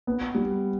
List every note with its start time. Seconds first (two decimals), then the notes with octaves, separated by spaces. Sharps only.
0.07 B3
0.35 G3